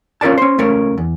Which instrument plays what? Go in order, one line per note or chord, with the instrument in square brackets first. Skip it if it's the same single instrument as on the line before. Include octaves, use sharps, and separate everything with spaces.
[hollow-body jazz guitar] C#4 F4 A#4 D5 A5
C#4 C5
C#2 A3 C#4 A#4
E2